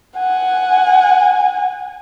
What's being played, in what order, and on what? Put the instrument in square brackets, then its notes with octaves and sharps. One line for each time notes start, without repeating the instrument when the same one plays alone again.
[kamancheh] F#5 G#5